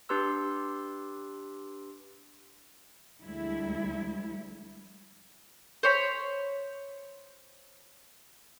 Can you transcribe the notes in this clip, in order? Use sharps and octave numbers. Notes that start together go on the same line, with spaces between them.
D4 G4 B4 C6 E6
D2 F3 G3 G#3 E4
C5 C#5 B5